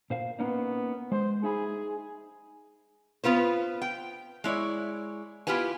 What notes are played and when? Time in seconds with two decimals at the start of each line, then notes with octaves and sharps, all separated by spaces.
0.10 A#2 C5 F5
0.39 A#3 B3 C#4 D#4
1.12 G#3 C5
1.43 D#4 G#4 E5 B5
3.24 B3 F4 B4 C5
3.82 G5
4.44 G#3 E4 C#5 D5
5.47 B3 E4 F4 G4 B4 G#5